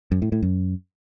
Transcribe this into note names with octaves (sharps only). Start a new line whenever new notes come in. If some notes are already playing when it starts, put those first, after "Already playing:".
F#2
A2
A2
F#2